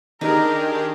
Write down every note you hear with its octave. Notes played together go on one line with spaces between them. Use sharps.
D#3 D4 D#4 G4 G#4 A#4